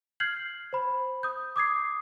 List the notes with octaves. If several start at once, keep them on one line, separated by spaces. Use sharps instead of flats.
F6 G6 G#6 C7 F#7
C5 B5
D#6 G6
D6 D#6 G#6 C7